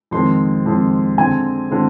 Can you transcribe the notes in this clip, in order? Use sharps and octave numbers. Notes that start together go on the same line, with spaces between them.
F2 D#3 G#3 C4 C6
F2 D#3 G#3 C4
D3 G#3 C4 G#5
D3 G#3 C4